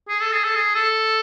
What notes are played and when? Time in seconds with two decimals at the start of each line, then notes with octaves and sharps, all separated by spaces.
0.09 G#4
0.20 A4
0.33 G#4
0.44 A4
0.55 G#4
0.75 A4